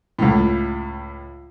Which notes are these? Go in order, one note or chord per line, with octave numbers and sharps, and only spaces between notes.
C#2 A2